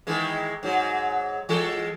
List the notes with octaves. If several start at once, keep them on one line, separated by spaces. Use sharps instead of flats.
D#3 E3 G#3
G#2 F#3
E3 G#3 A4